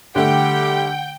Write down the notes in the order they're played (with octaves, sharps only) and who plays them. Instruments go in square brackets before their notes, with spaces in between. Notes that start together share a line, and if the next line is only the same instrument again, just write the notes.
[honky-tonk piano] D3 A3 [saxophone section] G3 G4 [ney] F#5 [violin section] G5